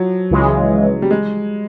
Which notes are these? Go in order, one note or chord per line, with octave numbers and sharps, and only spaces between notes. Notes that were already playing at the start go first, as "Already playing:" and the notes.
Already playing: F3 F#3
C#2 C#3 E3 G#3
G3
G#3